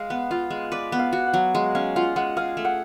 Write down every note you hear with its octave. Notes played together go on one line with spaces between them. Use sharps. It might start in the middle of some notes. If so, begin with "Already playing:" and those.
Already playing: G#3 F5
B3
F4 F5
G#3
B4 D5
B3
F5
F#4
F#5
F#3
G#3 F5
C#4 F5
F4 F#5
G#3 F#5
G#4 F5
A3
F#5